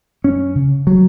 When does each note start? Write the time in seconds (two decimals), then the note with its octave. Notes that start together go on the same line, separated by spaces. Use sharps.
0.24 F#2 C#4
0.55 C#3
0.87 F#3